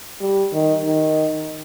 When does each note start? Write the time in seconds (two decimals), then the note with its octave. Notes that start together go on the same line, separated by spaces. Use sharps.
0.21 G3
0.53 D#3
0.84 D#3